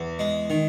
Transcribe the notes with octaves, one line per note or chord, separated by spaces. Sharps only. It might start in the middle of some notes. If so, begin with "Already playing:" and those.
Already playing: E2
G#3
D#3